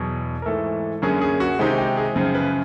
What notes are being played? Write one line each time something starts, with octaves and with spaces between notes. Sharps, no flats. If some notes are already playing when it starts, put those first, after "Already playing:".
Already playing: E2 B2 F#3 B3 G#4
A#4
G#2 E3 A3 A4
F#2 D3 F#3 A#3 C#4 G#4
G#4
F#4
C3 D#3 G#3 C4 D#4 G4
G4
G#4
F#2 C#3 F3
B4